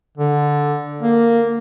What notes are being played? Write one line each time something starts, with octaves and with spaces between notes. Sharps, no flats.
D3
A#3